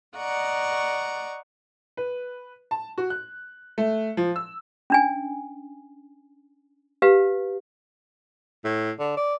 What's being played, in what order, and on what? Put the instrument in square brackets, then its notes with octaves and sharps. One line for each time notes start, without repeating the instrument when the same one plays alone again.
[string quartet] D5 D#5 F#5 A#5 C#6
[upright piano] B4
A5
F#4
F#6
A3
F3
E6
[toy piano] C#4 D4 G#5
G4 B4 F5
[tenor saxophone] A2
D3
D5